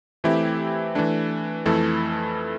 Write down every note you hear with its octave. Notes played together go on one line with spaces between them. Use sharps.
E3 A3 C4 E4 G4
E3 A3 D4
F2 E3 A3 E4 A4